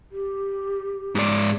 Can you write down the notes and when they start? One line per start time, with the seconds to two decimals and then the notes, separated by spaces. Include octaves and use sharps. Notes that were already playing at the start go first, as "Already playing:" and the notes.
0.12 G4
1.15 G#2 D5